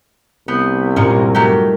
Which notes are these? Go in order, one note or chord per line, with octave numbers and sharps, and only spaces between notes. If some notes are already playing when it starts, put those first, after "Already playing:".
C2 B3 G6 C7 D#7
G2 A#2 G#3 C#4 A#4
F#3 A3 D#4 G4 A#4